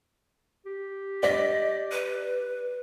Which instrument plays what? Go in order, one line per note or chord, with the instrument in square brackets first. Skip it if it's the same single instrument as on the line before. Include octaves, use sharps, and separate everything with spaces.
[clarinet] G4
[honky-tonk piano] D5 B6 [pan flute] D#5
[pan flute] B4